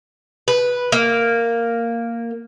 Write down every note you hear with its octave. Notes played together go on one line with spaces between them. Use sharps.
B4
A#3